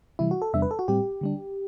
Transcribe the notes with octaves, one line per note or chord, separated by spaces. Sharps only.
C3 E3 G3 E4
F#4
A4
E2 C3 G3 B3 D4 E5
B4
A4
F#4
A2 G3 C4 G4
D3 G3 D4